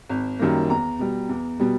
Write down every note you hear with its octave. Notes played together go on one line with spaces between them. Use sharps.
G#1
F#2 D#3 G3 A#3
E2 A#5
B2 G3
E2
B2 G3